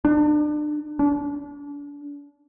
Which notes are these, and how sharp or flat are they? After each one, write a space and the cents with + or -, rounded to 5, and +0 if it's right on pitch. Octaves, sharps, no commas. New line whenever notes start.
D4 +30
D4 -35